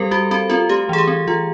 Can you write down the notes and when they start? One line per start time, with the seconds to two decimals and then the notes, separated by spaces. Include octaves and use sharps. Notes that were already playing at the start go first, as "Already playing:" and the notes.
Already playing: G3 C4 G4 A4 A#4
0.11 G3 F#4
0.31 C4 F#4
0.50 C4 F4
0.69 A3 G4
0.89 E3 G#4
0.98 G4
1.07 C4
1.27 E3 F4